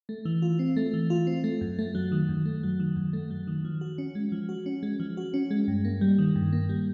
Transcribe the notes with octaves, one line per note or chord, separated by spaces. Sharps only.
A3
E3
F4
C4
A3
E3
F4
C4
A3
F#2
A3
F#3
D#3
F#2
A3
F#3
D#3
F#2
A3
F#3
D#3
F3
F#4
C#4
G#3
F3
F#4
C#4
G#3
F3
F#4
C#4
G#3
G2
A#3
G3
D#3
G2
A#3
G3